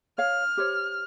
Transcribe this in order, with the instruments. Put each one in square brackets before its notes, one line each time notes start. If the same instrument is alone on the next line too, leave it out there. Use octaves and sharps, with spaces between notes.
[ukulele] C#5 F5 [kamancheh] F6
[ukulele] G4 C5 C#5